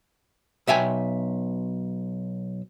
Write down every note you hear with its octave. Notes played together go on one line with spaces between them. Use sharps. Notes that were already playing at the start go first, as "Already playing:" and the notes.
B1 E5 G5 G#5